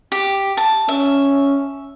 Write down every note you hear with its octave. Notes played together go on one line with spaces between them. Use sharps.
G4
A5
C#4 E5